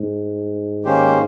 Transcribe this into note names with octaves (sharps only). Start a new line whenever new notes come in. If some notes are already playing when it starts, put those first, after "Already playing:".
Already playing: G#2
D#3 A#3 C#4 G4 C5